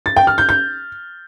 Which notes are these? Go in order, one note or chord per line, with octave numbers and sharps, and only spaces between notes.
A6
G5
F6
G6
G6